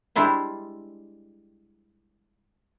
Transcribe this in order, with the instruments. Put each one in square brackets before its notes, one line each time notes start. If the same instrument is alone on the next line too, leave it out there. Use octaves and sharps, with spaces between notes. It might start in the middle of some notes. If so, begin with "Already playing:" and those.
[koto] G3 G#3 D4 E4 C5